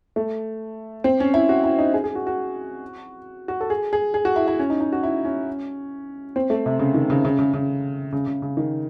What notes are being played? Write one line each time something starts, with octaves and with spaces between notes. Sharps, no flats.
A3
C4
C#4
E4
F#4
E4
D#4
G#4
G#4
F#4
F#4
F#4
A4
G#4
G#4
G#4
F#4
E4
E4
C#4
D#4
D#4
F#4
E4
C#4
C4
A3
C3
C#3
D#3
C#3
C#3
C#3
C#3
C#3
C#3
C#3
D#3